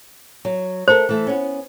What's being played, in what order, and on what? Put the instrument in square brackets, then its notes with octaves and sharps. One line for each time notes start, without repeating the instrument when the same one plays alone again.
[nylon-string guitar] F#3
[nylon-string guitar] A3 A4 A#4 [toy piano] C5
[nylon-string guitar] E3 A3
B3 C#4